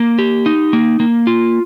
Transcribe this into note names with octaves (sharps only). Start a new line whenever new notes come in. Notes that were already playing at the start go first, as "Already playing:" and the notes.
Already playing: A#3
G4
D#4
A#3
A#3
F4